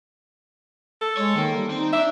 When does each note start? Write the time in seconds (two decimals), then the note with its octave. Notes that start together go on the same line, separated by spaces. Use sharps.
1.01 A4
1.17 G#3 C#5
1.36 D#3 A#3
1.56 G3
1.70 C4 D#4
1.93 D4 D5 E5